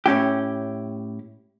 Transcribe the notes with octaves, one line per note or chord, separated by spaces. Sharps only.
A2 C#4 E4 G4